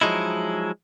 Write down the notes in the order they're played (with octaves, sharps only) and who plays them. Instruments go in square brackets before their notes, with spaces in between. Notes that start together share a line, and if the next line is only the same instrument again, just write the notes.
[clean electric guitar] F3 F#3 G#3 D#4 E4